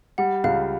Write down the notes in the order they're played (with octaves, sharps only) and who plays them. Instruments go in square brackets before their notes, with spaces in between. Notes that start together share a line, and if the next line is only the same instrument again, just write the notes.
[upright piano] G3 [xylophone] F#5
[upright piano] C#2 [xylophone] F5